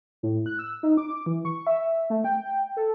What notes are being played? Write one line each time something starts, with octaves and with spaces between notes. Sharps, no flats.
A2
F#6
E6
D#4
D6
E3
C#6
E5
A3
G5
A4